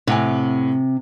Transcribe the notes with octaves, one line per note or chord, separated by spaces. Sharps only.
A2 C3 F#5 G#5